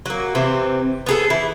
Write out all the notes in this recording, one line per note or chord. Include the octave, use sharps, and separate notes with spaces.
F#3 A#3
C3 E3 C4
B3 G#4 A4
E3 E4